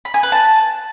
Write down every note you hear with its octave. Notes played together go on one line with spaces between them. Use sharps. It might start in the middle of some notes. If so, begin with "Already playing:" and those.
B5
G#5
B4
A5